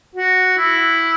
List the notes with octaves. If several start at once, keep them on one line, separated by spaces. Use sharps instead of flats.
F#4
E4